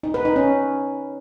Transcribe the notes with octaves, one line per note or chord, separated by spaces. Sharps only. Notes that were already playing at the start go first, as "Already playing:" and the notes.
D#4
B4
D#4
C#4